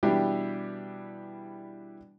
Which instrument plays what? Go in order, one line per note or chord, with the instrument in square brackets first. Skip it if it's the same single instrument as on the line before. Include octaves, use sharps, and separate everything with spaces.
[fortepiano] B2 E3 G3 D4 E4 G4